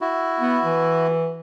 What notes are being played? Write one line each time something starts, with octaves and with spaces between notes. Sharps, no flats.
E4 F#4
B3
E3